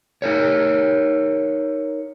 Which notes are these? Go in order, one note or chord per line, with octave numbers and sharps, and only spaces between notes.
D#4 A#4 C#5